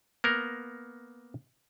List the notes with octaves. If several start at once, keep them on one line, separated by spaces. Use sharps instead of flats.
A#3 B3 A#4